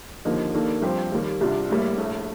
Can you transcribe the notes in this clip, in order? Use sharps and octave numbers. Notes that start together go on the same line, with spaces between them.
D#2 D3 F3 A#3 D#4
D#2 D#3 A#3 D4 A4
G2 F3 C4 G4 C5
D#2 D#3 G3 A#3
C2 C3 G3 D4 F4
A#1 A2 G3 A#3
A#1 A2 A3